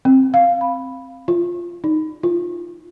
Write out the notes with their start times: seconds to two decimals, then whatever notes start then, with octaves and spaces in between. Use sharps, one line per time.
0.05 C4
0.34 F5
0.61 B5
1.28 F4
1.84 D#4
2.23 F4